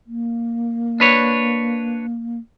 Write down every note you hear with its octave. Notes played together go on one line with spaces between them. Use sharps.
A#3
D4 B4 C#5